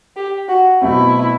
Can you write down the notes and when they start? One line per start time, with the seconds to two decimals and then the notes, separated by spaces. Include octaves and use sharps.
0.16 G4
0.48 F#4
0.82 B2 F#3 A3 C4 E4